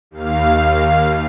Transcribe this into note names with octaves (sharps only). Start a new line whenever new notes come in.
D#2 F5